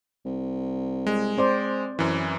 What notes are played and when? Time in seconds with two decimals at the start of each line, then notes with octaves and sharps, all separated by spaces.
0.25 C2
1.07 G#3
1.37 C4 C5 D5
1.99 F#2 E3